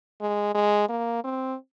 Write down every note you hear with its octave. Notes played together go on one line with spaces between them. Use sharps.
G#3
G#3
A#3
C4